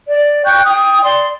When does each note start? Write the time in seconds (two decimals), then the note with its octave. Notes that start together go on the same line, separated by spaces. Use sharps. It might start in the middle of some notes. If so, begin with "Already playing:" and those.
0.07 D5
0.45 G5 C#6 F#6 G6
0.67 G5 D#6
1.03 D5 C6